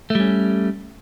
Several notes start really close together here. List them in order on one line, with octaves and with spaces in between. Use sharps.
A3 G3 C#4